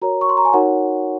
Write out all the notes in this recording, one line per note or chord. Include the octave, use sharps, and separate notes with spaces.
F#4 A#4 C#5 A#5
C#6
C6
A#5
G#5
D#4 F#4 A#4 C#5 F#5